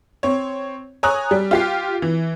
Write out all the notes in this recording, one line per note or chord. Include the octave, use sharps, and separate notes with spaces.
C4 C#5
C#5 G#5 A#5 D#6 F#6
G3
F4 G4 C7
E3